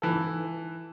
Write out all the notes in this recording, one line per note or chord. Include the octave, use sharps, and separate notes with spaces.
E3 A4